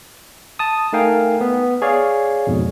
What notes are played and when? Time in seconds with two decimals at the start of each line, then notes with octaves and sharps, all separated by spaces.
0.59 A5 D#6
0.93 A3 D#4 A#4 F5 G5 G#5
1.41 B3
1.82 G#4 C#5 D5 F5
2.47 F2 G#2 B2